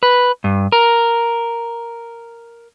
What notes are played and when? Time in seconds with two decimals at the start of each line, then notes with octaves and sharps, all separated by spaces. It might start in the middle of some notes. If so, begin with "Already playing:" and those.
0.03 B4
0.44 G2
0.72 A#4